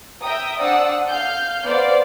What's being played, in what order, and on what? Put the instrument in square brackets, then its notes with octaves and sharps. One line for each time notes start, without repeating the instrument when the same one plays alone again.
[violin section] E5 G5 A#5 D#6
D4 C5 D5 F#5 D#6 E6
F5 F6 G6
B3 C5 D5 F5